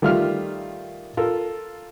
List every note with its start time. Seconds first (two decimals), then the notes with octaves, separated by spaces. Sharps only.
0.02 D#3 G3 A3 F4 E5 F6
1.17 F4 A4 A#4